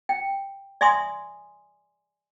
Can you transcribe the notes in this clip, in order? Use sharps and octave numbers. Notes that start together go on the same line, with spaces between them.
G5
D5 E5 G#5 C6 D#6